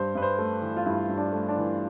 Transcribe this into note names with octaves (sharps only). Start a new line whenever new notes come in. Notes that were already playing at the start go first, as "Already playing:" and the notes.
Already playing: G2 C5
G2 B4
C5
A3
E3
F4
G2 E4
G2
D4
A3
D4
E3